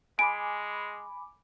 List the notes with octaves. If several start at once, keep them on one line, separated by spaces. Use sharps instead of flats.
G#3 G#5 B5 D6 D7